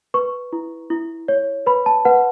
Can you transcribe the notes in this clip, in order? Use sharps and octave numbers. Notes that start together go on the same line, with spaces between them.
B4 C#6
E4
E4
C#5
B4 B5
A5
B4 F#5